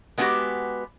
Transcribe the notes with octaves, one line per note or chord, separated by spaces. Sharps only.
G#3 B3 C#4 E4 F#4 G4